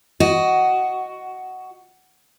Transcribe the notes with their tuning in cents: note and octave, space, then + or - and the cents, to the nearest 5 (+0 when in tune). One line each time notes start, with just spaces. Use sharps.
F#4 +10 D#5 +0